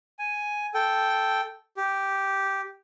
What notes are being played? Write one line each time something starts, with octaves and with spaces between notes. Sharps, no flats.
G#5
A4 G5
G4